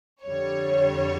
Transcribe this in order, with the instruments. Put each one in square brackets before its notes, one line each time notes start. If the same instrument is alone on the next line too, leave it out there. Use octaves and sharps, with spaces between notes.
[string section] F2 D3 G3 C#5